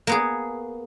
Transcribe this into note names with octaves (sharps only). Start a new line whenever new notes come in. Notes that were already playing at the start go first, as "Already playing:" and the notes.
A#3 B3 G#4